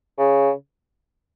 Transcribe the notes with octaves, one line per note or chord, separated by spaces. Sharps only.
C#3